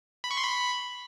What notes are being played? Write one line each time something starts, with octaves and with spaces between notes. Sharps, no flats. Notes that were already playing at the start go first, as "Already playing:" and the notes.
B5
C#6
C6
B5